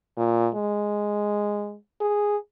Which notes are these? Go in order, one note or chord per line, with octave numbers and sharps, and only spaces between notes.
A#2
G#3
G#4